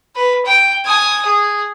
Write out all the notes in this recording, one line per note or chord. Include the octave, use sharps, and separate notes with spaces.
B4
G5
G#5 D#6
G#4